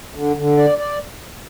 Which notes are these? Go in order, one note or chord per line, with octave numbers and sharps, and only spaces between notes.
D3
D3
D5
D5